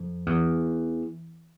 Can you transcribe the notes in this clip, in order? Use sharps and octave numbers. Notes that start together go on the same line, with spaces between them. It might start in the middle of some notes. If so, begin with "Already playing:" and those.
Already playing: F2
E2